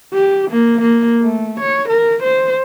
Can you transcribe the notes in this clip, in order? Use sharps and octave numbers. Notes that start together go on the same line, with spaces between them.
G4
A#3
A#3
A3
C#5
A#4
C5